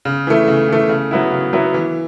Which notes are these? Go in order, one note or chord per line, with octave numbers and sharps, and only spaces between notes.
C#3
E3 A3
C#3
E3 A3
C#3
F#3 B3 E4
C#3
F#3 B3 E4
E3